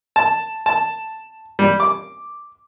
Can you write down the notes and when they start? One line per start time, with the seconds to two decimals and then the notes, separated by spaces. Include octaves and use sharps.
0.16 A5
0.66 A5
1.59 G3
1.80 D6